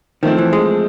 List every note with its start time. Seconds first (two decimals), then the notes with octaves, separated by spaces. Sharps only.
0.23 D#3 F3 A3 C4
0.38 E3
0.53 G#3